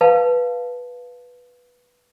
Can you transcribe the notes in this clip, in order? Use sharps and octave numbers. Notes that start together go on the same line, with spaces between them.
B4 F5 A5